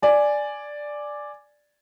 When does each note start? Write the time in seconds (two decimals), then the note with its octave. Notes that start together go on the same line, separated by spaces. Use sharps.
0.02 D5 G#5